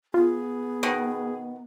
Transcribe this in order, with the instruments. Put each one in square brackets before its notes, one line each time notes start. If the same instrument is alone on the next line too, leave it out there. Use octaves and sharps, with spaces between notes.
[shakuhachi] B3 [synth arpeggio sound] F4 [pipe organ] G#4
[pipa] B2 D#3